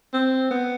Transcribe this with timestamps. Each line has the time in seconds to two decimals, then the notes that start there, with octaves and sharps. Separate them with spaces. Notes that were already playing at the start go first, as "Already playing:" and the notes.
0.14 C4
0.51 B3